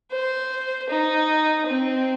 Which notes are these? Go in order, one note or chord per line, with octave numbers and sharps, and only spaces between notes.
C5
D#4
C4